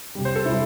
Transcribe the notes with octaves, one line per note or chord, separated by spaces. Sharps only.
C3 G3
C5
A4
C3 G3 E4